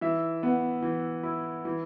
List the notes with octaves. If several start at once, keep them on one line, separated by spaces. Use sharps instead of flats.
E3 E5
B3
E3
E4
E3